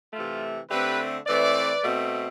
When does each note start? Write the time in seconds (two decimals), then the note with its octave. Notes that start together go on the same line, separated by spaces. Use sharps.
0.13 C3 E3 A3 F4
0.70 D3 A3 C4 G4 B4
1.26 E3 A3 C4 B4 D5
1.82 B2 A3 C4